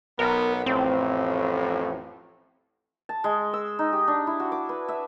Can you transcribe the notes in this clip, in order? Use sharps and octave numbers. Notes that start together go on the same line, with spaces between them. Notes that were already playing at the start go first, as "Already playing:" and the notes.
B1 B3 A#4
A1 F2 A2 C4
A5
G#3
E6
D#4
G4
D4
E4
F#4
D6
B4
E5